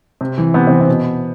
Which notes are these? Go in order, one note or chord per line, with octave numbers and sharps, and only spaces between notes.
C3
E3
C3 B3
E3 C4
B3
B2